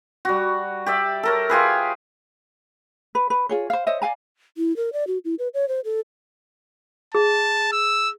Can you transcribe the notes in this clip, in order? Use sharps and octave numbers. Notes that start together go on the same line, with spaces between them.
G3 F#4
G4 D5 E5
A4 A#4 C#5
F4 G4 G#4 B4
B4
B4
F4 G#4 C#5
C5 F5
C5 C#5 D#5 E5
D5 F5 G#5 A#5
E4
A#4
D5
F#4
E4
B4
C#5
C5
A4
G#4 A5
E6